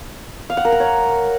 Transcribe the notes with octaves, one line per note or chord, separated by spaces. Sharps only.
F5
F#5
A#4
A#5
C#5